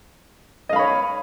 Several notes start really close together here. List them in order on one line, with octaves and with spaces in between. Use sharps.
D#5 F5 B5 C#5